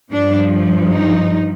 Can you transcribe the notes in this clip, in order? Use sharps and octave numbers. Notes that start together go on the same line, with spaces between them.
G2 F3 D4
D#4